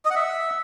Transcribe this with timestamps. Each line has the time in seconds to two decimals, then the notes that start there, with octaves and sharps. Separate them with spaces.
0.05 D#5
0.10 F#5
0.16 E5